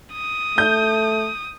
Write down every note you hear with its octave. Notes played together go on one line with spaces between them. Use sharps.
D#6
A3 G6